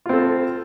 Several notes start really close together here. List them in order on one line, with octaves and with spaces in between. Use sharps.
F4 C4 A4